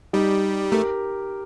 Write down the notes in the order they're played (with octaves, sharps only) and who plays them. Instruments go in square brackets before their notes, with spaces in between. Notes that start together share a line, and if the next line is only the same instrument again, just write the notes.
[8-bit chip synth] G3 [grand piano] D#4 G4
[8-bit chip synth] A3 [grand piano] G4 A#4